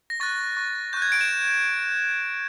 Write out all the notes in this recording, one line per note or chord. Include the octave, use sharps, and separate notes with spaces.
A#6
C#6 F#6 A6
C#6 F#6
C#6 F#6 G6
G#6
D7
E7